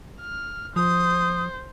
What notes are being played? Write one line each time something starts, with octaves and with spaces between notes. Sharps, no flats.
F6
F3 C5 D#6